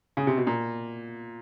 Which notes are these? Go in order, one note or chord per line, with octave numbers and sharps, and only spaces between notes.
C#3
C3
B2
A#2